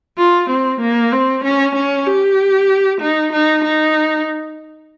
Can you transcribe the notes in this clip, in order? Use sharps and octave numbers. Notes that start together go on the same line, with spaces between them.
F4
C4
A#3
C4
C#4
C#4
G4
D#4
D#4
D#4